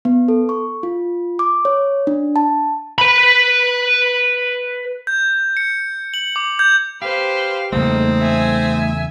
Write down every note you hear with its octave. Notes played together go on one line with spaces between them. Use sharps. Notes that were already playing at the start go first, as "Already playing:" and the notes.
B3
A4
C#6
F4
D6
C#5
D4
A5
B4 B5
G6
C#7
F#7
D6
G6
G4 B4 C5 F5
E2 C#3 G3 A3 A#3 C4 D#4
E5 G#5